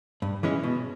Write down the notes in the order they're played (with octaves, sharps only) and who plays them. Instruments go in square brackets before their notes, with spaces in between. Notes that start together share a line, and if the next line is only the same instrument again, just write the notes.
[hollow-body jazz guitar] G2
E3 G#3 C#4
B2